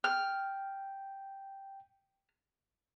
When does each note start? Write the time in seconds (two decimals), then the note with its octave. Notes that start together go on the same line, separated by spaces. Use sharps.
0.04 G5 F6